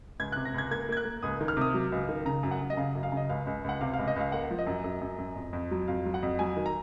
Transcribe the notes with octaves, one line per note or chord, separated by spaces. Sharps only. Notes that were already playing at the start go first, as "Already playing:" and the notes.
C#2 G#6
C3 F#6
A#6
C#2 G#6
A#3 G#6
A#3 G#6
F#6
A#3
C#2 D#6
D#3
F6
C3 D#6
F#3
C#2
D#3
C#3 A#5
F#2
F#5
F#2
D#5
C#3 F5
F#2
F5
C#3
D#5
C#2 F5
C#2
C#2 F#5
C3 F5
C#2 F5
D#5
C#2 F5
A#3 F#5
F3
D#5
F#2
F#2
F#2
F#2
F2
F2
F#3
F2 F5
F#3
F#5
F2
F#3 G#5
D#3
A#5